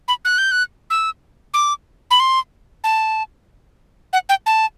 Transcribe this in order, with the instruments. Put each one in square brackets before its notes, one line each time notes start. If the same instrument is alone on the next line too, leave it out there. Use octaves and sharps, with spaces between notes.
[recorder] B5
F#6
G6
F#6
E6
D6
B5
C6
A5
F#5
G5
A5